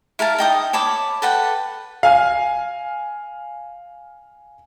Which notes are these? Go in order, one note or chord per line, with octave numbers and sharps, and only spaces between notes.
E4 A#4 F5 A5
D#4 G5 D#6
C#5 A5 B5 D6
A4 B4 F#5 G5
F5 G#5 F6